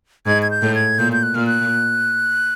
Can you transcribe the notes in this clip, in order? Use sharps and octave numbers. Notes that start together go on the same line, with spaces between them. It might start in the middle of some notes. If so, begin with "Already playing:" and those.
G#2 G#6
G#6
G6
A2
G#6
A#2 G6
G6
F#6
A#2 F6
F#6